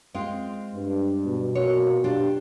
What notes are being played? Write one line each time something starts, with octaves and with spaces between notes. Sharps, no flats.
G#3 C4 F4
G2
B2
A#2 F#4 C#5
D4 F4 G4